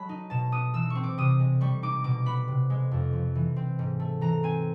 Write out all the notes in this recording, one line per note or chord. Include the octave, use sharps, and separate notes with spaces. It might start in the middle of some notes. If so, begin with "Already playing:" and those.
Already playing: F#3 G#3 A5 B5
D#4
B2 A5
B3 D#6
E3 E6
C4 C#6
D6
C3 D#6
G#3
G3 C#6
D#4 D6
B2 D6
B3 B5
C3
G#3
F2
F3
E3
C4
G#2
A3
E3 A#5
C4 G#5